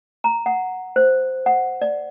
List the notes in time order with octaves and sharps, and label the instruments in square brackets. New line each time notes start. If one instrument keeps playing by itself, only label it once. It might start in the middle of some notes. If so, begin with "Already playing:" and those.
[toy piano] A#5
F#5
C5
F#5
D5